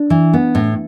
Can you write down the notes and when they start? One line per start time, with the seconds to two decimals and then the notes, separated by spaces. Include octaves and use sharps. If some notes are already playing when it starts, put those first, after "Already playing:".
Already playing: D4
0.10 E3
0.33 B3
0.55 A2